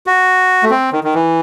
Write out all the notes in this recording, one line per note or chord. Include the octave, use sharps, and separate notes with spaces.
F#4
A3
C4
D#3
D#3
E3